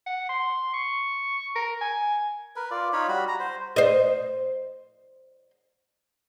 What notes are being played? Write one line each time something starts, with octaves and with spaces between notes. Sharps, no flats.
F#5
C6
C#6
A#4
G#5
A#4 B4
F4 D5
D#4 F4 C#5 B5
G3 F#4 B5
A#5
C5
C5 D#5